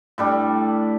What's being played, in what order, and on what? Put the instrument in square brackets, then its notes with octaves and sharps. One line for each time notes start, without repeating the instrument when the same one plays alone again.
[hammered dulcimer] A2 G3 D4